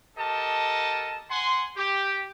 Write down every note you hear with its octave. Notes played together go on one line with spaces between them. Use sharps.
G4 A4 A#4 D#5 A5
F#5 G#5 C6
G4